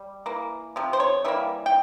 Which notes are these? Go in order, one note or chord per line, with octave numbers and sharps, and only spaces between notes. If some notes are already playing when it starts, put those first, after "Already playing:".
Already playing: G3
E3 A#3
C3 F3
C5
C#5
E3 G3 A#3 E5
G5